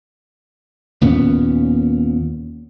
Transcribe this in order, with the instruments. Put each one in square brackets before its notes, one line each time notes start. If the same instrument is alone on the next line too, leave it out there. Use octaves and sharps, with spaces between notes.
[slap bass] D#2 A#2 B3 C#4